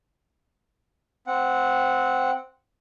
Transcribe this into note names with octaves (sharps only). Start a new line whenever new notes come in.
C4 F#5